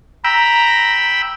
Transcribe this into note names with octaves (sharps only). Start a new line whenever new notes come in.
G5 A#5 B5 E6